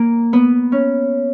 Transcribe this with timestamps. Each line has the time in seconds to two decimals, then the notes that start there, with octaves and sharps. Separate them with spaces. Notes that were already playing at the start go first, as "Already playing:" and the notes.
Already playing: A#3
0.33 B3
0.72 C#4